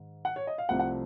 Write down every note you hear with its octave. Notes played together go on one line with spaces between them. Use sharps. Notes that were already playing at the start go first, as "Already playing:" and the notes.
Already playing: G#2 D#3
F#5
C#5
D#5
F5
C2 C3 F3 A3 C4 F#5
F#5